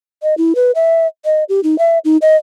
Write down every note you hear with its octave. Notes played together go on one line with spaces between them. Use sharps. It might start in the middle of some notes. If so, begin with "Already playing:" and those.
D#5
E4
B4
E5
D#5
G4
D#4
E5
D#4
D#5